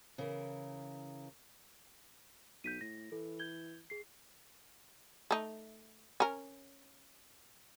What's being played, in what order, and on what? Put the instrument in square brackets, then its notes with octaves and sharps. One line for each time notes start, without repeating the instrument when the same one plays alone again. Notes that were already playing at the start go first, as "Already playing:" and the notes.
[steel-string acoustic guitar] C#3 E3 A#4
[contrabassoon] B1 [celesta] G6 B6 D#7
[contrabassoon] A2 [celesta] A#6
[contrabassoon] E3 [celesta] A4
[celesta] G6 G#6 G7
G#4 C7
[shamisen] A3 D#4
C#4 A#4